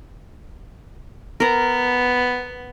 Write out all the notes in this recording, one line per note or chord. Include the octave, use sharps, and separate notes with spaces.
B3 A#4 A#5